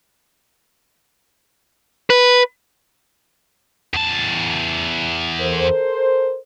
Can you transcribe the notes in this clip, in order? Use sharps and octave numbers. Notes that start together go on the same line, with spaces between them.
B4
E2 A5
A4 A#4 C5